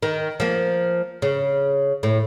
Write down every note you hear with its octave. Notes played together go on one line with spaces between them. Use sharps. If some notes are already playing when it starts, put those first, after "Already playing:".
D#3
F3 A#3
C#3
A2